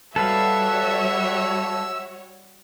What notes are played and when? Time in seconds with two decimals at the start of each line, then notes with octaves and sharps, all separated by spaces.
0.16 G3 F#4 A4 B4 C#5 E5 F5 E6